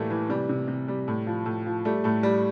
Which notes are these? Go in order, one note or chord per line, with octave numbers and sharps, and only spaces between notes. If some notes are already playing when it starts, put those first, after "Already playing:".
Already playing: A2 E3 G3 A3 A#3
E3
C3 G3
C3
C3
G3
A2
F3
A2
F3
G3 A3
A2 A3
G3